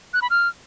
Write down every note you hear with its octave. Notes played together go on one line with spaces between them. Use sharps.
F#6
B5
F6